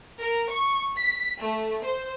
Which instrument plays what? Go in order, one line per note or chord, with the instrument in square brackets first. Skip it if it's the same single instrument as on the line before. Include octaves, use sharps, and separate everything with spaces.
[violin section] A#4
C#6
B6
A3
C5